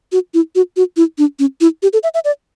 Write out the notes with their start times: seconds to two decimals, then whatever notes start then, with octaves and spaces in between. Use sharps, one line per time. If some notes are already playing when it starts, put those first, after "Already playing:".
0.12 F#4
0.34 E4
0.55 F#4
0.77 F#4
0.97 E4
1.18 D4
1.39 C#4
1.61 E4
1.83 G4
1.93 A4
2.03 E5
2.14 E5
2.25 D5